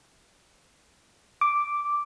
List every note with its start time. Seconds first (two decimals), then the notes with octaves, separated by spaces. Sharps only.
1.41 D6